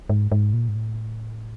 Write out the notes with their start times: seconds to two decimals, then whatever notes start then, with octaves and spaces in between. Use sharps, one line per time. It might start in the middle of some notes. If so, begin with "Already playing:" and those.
0.10 G#2
0.32 G#2
0.53 A#2
0.69 G#2
0.75 A2